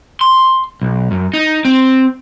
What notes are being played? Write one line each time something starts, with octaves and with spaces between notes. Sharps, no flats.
C6
B1
F#2
D#4
C4